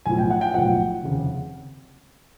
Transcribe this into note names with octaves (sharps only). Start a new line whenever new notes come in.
B1 A2 F3 G#5
G5
F#5
G5
B1 A2 F3 F#5
F1 D#2 C#3